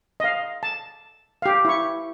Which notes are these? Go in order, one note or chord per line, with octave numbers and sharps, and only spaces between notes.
D#5 F5
A5
G4 F5
E4 C#6